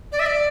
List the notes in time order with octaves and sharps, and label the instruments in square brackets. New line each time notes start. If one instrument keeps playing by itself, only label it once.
[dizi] D5
E5
D5